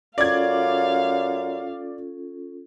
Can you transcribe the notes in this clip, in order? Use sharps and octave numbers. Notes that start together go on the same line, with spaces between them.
F#2 C#4 F4 A4 D5 F5 G#6